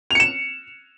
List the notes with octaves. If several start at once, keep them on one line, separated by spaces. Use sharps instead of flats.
C#7 E7 F7